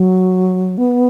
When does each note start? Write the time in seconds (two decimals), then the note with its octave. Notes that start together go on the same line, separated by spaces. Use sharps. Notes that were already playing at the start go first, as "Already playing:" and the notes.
Already playing: F#3
0.78 B3